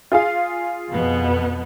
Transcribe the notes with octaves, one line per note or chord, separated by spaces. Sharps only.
F4 G#4 F5
F2 B2 B3